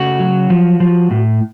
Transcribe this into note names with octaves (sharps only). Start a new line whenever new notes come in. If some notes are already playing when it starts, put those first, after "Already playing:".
Already playing: C#3 A3 F#4
F#3
F3
F3
A2